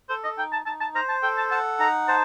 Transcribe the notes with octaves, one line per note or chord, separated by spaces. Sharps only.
A4 C5
D#5
D#4 G5
A5
D#4 A5
A5
C5 A#5
A5
A4 G5
A5
F#5 A5
D#4 A#5
C5 A5